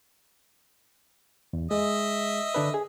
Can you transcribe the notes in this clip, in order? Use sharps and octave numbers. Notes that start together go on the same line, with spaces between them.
E2
G#3 D#5 E5
D3 D4 B4
G#4